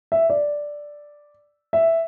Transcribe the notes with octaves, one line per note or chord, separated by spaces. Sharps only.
E5
D5
E5